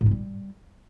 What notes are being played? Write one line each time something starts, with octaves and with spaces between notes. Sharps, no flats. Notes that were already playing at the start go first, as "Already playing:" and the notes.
G#2
C3
G3